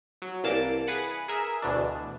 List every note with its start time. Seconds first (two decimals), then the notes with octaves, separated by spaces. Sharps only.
0.22 F#3
0.44 C2 E3 A#3 A5 D6
0.87 G#4 B4 F#5
1.28 G#4 A#4 E5
1.62 D2 B2 E3 D4